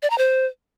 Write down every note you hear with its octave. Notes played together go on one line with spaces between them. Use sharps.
D5
A#5
C5